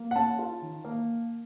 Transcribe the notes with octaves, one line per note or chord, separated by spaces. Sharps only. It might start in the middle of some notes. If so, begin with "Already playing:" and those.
Already playing: A#3
F#5
C#4 A5
F4
D#3
A#3